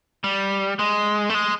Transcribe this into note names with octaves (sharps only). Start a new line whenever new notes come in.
G3
G#3
A3
G#3